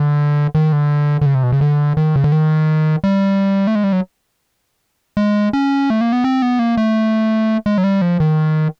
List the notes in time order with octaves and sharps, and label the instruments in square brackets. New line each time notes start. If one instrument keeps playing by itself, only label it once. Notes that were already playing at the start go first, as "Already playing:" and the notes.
Already playing: [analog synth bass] D3
D#3
D3
D3
C#3
C3
B2
C#3
D3
D#3
C#3
D3
D#3
G3
A3
G#3
G3
F#3
G#3
C#4
A3
A#3
B3
C4
B3
A#3
A3
G#3
F#3
G3
F3
D#3